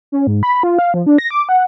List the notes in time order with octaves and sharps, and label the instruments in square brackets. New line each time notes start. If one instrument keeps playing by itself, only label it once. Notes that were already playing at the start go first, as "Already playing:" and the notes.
[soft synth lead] C#4
G#2
B5
F4
F5
F3
D4
A#6
D6
F#5